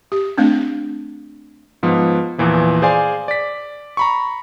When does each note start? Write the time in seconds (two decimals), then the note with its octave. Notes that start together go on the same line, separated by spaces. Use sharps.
0.12 G4
0.38 A3 C4 D4
1.83 G#2 F3 B3
2.38 E2 A#2 E3 F3
2.82 G#4 C5 D5 F5 G#5
3.28 D5 B6
3.97 A#5 B5 C#6